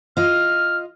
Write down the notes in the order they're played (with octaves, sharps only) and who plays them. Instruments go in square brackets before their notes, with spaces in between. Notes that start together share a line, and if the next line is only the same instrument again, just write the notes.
[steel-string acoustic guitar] F4 D#5 [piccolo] F6